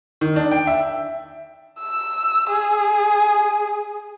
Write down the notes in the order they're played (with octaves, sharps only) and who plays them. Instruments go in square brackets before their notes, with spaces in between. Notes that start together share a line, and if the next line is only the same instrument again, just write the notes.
[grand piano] D#3
D4
G5
E5
[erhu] E6
G#4